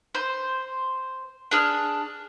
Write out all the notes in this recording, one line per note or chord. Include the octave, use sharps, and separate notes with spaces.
C5
D4 G#4 F6